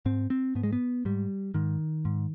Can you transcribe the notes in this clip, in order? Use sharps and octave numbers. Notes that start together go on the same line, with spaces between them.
G#2 C4
C4
G#2 B3
G#3
B3
G#2 G3
G#2 D#3
G#2